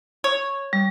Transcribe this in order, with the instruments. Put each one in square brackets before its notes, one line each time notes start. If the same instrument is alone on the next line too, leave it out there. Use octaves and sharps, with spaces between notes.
[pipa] C#5
[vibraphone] G3